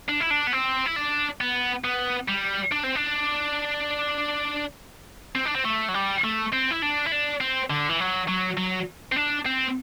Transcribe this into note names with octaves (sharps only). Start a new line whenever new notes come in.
D4
E4
D4
B3
C4
E4
D4
B3
B3
G3
D4
C4
D4
C4
D4
C4
A3
F#3
G3
A3
C4
E4
D4
E4
D4
C4
D3
E3
F#3
F#3
F#3
C4
D4
C4